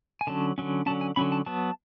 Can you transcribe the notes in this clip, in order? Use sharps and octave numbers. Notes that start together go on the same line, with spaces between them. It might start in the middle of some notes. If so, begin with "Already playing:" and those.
G#5
D3 F#3 C#4 A5
D3 F#3 C#4
D3 F#3 C#4 A5
G#5
D3 F#3 C#4 B5
A5
F#3 B3 A5